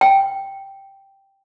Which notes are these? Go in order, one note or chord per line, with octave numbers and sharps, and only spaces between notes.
G5